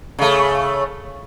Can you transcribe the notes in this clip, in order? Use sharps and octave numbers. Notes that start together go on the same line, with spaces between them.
C#3 A3